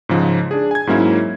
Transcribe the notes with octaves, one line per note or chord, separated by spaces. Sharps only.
G#2 C#3 F3 G#3
D4 G#4
G#5 G#6
G#2 F#3 A#3 C#4 E4